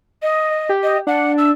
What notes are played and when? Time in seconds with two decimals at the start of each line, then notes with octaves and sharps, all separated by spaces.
0.22 D#5
0.69 G4
0.83 D#5
1.07 D4 F#5
1.38 E6